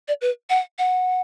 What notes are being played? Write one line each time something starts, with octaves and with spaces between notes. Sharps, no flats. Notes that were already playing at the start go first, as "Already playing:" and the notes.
D5
B4
F#5
F#5